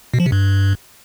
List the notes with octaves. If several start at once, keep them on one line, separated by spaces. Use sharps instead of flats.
B2
F3
C3
G2